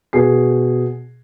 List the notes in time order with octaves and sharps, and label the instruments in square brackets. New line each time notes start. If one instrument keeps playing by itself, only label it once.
[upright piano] B2 G#4 C7